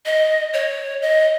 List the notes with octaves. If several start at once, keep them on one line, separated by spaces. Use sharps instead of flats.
D#5
C#5
D#5